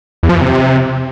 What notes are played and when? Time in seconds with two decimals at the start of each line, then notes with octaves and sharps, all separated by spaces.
0.23 E2
0.29 F3
0.35 E3
0.41 C3